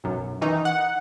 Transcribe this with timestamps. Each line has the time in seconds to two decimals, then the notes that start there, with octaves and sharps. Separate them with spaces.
0.04 B1 F#2
0.41 D#3 E3 D#4
0.65 F#5